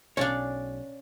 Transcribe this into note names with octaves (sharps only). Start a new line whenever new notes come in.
B1 C#4 D4 C#5 D5 F5